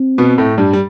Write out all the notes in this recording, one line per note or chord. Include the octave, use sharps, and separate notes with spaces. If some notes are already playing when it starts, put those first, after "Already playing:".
Already playing: C4
B2 B3
A2 A3
G2 G3
G3